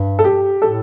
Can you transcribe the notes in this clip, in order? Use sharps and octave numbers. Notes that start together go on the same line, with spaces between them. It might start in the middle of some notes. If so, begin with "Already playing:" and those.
Already playing: G2
A4
G4
A2 A4